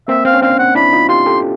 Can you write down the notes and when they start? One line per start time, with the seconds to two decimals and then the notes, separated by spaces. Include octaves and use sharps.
0.08 A#3 C4 E5
0.25 C4 F5
0.33 C#4
0.42 C4 D4 F5
0.59 F#5
0.75 D4 E4 B5
0.93 D#4 F4
1.09 F4 G4 C6
1.26 G4 A4